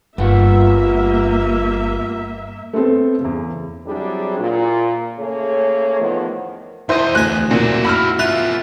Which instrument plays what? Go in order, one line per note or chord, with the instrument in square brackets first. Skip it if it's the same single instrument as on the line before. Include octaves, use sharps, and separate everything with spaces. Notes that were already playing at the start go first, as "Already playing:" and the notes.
[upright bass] G1 [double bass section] G2 [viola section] A#3 E5 [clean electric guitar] B3 F4 F#5
[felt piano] A3 B3 C4 A4
E2 C#3
[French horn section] F#3 G3 C4 D4 E4 G#4
A#2
C#3 A3 A#3 G#4 C#5
E2 A2 D#3 F3 A3 B3
[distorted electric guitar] E2 D#5 [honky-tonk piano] E4 C5 G6
[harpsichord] D2 G#5 [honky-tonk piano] F#6
[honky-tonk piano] B1 A#2 [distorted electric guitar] E4 F#4
[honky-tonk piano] B5 E6 F6
[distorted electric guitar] B3 F4 [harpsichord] E5 [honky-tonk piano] F#6